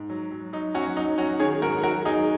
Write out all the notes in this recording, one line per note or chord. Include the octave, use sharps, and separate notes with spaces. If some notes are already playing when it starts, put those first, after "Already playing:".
Already playing: G#2
F#3
F#3
F#3 D#4
F#3 C#4 F#4
F#3 D#4
F#3 C#4 F#4
D#3 G#4 C#5
G#2 F#4 A#4
F#3 F#4 A#4
F#3 D#4 G#4